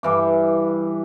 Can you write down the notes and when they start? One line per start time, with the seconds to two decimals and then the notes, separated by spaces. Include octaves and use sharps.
0.03 G2 E3 D6